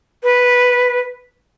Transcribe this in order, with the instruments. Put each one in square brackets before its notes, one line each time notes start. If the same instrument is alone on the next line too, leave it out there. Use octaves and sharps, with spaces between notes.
[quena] B4